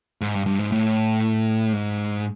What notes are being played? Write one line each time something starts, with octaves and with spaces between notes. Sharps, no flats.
G#2
G2
G2
G#2
A2
G#2